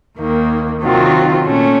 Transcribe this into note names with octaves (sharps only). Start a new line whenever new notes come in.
D#2 D#3 A#3
C3 D#3 F#3 C4 F4
A#2 A3 C#4